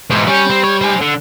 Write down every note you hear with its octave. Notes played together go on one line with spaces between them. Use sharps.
G#2 B2 E3
G3 C#4
C4
C#5
C5 G#5
D3